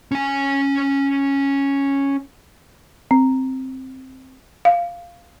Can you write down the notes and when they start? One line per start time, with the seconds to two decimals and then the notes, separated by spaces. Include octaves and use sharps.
0.11 C#4 G#5
3.11 C4
4.65 F5